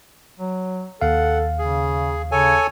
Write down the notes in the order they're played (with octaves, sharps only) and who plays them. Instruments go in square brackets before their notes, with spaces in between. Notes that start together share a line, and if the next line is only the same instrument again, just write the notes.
[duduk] F#3
[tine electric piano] D#2 F5 [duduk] A4 [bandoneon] F#5
[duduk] C#3 [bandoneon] G#4
[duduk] C#3 [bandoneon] A4 C#5 G#5